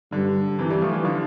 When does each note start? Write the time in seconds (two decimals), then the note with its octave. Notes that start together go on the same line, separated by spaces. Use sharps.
0.12 G2 D3
0.59 C3 E3
0.70 E3 G3
0.82 F3 A3
0.93 E3 G3
1.04 D3 F3